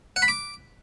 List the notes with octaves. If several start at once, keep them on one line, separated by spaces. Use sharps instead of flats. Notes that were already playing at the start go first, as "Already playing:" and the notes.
F#5
B5
D6